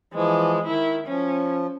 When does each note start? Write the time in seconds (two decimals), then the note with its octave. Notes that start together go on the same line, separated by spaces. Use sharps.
0.14 E3 F3 G#3
0.67 D#3 E4
1.07 F3 C#4